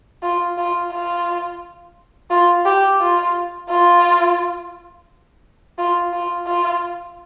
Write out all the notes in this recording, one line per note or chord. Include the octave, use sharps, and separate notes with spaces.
F4
F4
F4
F4
G4
F4
F4
F4
F4
F4